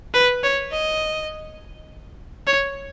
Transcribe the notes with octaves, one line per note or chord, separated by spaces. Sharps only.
B4
C#5
D#5
C#5